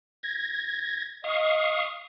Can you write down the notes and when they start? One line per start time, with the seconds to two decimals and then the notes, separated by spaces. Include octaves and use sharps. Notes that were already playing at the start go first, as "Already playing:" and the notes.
0.23 G#6 A#6
1.24 D#5 F5 C#6 D#6